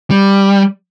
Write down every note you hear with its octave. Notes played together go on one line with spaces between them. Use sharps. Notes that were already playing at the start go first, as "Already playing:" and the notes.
G3